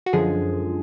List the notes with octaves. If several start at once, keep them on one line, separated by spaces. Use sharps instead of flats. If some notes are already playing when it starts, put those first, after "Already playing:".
F#4
F#2 D3 F3 G#3 G#4